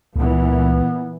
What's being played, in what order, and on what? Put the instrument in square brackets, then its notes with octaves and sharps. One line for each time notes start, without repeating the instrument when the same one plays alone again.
[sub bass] C#2 [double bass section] A#2 E3 [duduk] B3